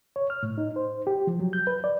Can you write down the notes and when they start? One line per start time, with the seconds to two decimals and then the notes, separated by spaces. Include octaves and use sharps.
0.16 C#5
0.30 F6
0.43 A2
0.58 D#4
0.76 C5
1.07 G4
1.27 F3
1.40 F#3
1.53 G6
1.67 B4
1.84 D5